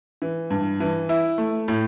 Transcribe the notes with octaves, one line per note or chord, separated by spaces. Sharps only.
E3
G2
E3
E4
A3
A2